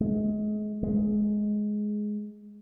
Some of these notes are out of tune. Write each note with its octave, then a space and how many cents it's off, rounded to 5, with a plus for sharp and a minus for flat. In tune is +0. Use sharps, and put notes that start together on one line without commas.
G#3 +30
G#3 +10